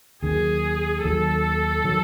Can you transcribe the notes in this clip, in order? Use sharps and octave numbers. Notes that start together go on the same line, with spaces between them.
D#2 D#3 F#3 G#4
D#2 D#3 F#3 A4
D#3 F#3